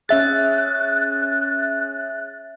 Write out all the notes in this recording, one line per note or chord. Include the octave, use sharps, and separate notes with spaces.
C#4 G#4 E5 F#6 A6